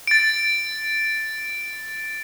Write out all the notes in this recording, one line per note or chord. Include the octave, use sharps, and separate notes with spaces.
A6 D7